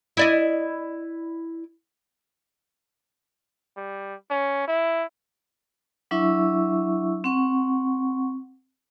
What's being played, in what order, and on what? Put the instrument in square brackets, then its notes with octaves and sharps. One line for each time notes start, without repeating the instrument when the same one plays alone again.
[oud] E4 D5 D#5
[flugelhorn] G3
C#4
E4
[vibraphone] F#3 D4 E4 E5 C#6 E6
C4 F#5 C#6